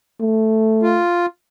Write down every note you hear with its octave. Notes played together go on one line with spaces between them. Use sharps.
A3
F4